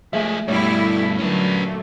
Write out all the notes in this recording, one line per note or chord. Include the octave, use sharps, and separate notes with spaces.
F3 G#3 A3 G#4 E5
G2 B2 G3 A3 E4 C#5
A#2 D3 F#3 C#4 B4